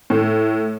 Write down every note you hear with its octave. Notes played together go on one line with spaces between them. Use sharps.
A2